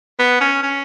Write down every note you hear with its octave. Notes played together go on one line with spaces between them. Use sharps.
B3
C#4
C#4